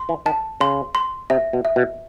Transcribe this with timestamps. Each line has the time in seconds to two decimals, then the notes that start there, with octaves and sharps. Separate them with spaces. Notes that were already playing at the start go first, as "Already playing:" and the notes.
Already playing: C6
0.09 E3
0.26 D#3 A5
0.60 C#3 C6
0.95 C6
1.30 C3 E5
1.53 B2
1.65 E5
1.76 B2